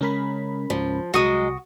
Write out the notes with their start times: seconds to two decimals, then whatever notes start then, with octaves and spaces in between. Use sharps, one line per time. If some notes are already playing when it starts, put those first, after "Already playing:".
0.01 C#3 G#3 C#4 A#4 B5
0.70 C#2 G#2 F3
1.14 C2 F#3 G#3 F#4 D#6